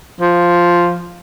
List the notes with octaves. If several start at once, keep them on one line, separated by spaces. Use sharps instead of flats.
F3